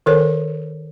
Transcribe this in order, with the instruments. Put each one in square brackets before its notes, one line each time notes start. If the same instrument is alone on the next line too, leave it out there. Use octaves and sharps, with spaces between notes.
[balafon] D#3 A4 A#4 C#5